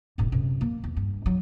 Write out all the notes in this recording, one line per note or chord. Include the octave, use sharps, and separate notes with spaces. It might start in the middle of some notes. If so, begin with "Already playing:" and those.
D#1 G#2
F#2 C3
A#3
E2
G2
F#3 D#4